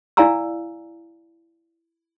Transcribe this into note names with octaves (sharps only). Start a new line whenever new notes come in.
E4 D5 F5 G#5 A#5 E6